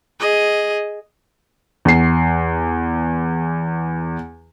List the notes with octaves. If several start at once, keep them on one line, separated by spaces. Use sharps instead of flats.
G#4 D#5
E2 C7